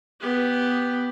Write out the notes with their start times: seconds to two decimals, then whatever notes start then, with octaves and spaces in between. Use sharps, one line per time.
0.21 B3 G4